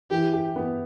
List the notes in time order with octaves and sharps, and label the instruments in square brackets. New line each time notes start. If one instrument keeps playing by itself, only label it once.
[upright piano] E3 [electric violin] G4
[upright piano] G4
B3